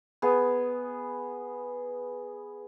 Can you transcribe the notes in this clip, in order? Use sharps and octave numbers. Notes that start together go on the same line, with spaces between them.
B3 G#4